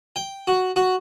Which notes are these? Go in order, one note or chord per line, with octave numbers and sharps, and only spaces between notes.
G5
F#4
F#4